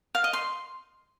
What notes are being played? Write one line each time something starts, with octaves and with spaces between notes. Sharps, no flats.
F5
D#5
C6